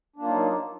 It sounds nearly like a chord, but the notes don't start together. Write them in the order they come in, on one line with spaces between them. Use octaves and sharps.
D4 A#3 F4 F#3 D#4